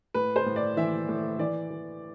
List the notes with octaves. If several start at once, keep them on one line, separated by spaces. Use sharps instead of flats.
A2 B4
C5
A2
D5
E3 E5
A2
E3 D5
E3